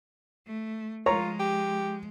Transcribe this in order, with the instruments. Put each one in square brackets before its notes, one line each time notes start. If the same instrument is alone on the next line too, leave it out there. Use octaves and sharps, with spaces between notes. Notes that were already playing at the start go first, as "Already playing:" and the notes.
[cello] A3
[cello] F3 G#3 [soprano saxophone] F4 [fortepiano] C#5 A#5
[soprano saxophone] G4